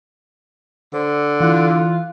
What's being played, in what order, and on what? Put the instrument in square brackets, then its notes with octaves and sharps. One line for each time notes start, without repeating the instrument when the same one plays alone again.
[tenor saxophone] D3 [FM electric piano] C5
[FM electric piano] E3 E4 F#6 [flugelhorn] F4